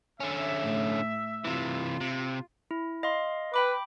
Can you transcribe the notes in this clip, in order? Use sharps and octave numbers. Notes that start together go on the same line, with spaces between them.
D3 C#4 E5
A2
C3 E3 F4
C3
E4
D#5 F5 C6
B4 G5 B5 D6